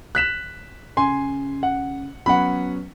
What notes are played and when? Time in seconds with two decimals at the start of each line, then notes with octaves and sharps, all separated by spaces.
0.15 F#6 B6 E7
0.97 C#3 G#5 C6
1.63 F#5
2.26 F#3 B3 C#4 F#5 B5